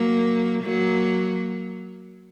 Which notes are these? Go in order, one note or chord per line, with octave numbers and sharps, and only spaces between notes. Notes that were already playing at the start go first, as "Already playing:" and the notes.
Already playing: F#3 A#3
F#3 A#3